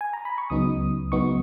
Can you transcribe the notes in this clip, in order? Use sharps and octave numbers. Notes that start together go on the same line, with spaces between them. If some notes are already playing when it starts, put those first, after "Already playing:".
G#5
A#5
B5
C#6
C#2 C#3 F#3 B3 D#4 D#6
C#2 C#3 F#3 B3 D#4 C#6